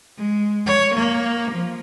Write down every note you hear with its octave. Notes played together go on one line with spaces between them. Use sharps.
G#3
C#5
A#3
F3